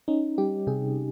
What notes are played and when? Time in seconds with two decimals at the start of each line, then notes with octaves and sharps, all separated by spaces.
0.08 C#4 D#4
0.38 G3 G4
0.67 C3 G#4